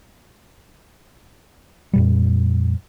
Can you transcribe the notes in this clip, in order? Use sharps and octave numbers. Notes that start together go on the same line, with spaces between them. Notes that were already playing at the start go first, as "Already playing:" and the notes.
F2 A#2 G3